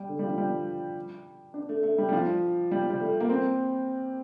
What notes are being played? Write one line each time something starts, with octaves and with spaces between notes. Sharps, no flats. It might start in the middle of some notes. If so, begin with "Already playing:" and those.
Already playing: G3
D3
G3
F3
G3
D4
A3
A3
G3
G3
F3
G3
G3
A3
A#3
C4